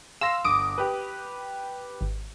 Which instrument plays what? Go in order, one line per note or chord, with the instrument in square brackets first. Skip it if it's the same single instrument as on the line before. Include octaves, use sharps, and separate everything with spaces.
[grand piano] F5 C6 A#6 [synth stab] E6
[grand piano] G1 [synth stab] D6 D#6 D7
[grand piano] G4 B4
[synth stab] G#1